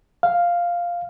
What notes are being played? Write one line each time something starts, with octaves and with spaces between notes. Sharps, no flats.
F5